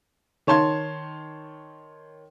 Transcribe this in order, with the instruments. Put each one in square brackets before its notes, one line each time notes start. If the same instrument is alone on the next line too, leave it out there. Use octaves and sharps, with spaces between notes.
[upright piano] D#3 C#5 A5 C6 G#6